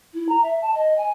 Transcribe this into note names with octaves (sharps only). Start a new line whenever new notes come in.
E4
A#5
E5
A5
D#5
G#5